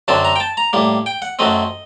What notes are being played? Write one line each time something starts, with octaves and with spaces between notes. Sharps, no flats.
F#2 D3 F#3 C4 A5
A#5
G5
A5
A#5
A2 G3 A#3
G5
F#5
F#2 F#3 A3 C4 D#5